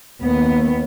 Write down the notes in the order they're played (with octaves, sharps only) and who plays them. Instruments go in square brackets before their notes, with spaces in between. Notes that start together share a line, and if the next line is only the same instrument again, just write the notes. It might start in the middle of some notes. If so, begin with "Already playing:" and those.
[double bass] D#2 [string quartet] B3